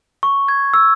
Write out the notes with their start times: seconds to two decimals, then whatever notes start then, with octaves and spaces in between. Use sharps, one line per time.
0.23 C#6
0.48 G#6
0.74 E6